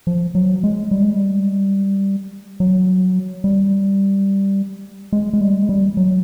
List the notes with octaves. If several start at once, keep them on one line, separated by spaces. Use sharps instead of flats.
F3
F#3
G#3
G3
G#3
G3
F#3
G3
G#3
G#3
G3
G#3
G3
F#3